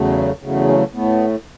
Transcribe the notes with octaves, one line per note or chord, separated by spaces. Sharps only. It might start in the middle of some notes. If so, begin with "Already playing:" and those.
Already playing: E2 C#3 F#3 A3
E2 C#3 F#3 A3
C#4
A2 A3 B3